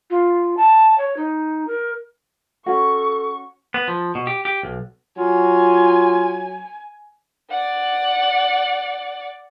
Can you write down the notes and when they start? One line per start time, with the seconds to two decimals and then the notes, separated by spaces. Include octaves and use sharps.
0.10 F4
0.57 A5
0.98 C#5
1.17 D#4
1.68 A#4
2.66 C#4 F#4 A4 C#6
3.74 B3
3.88 F3
4.15 B2
4.27 G4
4.45 G4
4.63 B1
5.18 F#3 F4 G#5
7.51 D5 F#5